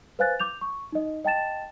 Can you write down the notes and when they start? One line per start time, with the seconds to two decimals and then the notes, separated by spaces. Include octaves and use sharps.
0.19 B4 C5 F5 G#5 F#6 A6
0.40 D6 G6 F7
0.61 C#6
0.92 D#4 D#5
1.24 D#5 G5 A5 A6 E7